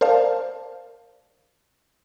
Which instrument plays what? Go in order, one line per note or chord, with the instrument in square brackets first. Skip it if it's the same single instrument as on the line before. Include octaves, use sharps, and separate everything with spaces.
[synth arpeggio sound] A#4 C5 D5 F5 A5